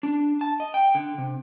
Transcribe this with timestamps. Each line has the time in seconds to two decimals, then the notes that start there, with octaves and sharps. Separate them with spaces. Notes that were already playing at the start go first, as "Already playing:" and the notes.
0.03 D4
0.41 A5
0.60 D#5
0.74 G5
0.95 D3
1.18 C3